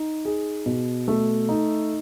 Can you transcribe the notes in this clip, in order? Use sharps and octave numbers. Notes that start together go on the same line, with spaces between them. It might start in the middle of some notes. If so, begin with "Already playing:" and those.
Already playing: D#4
G#4
B2
A3
D#4